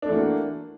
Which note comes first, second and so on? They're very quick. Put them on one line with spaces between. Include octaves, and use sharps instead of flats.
D4 A3 E3 F#4 A#3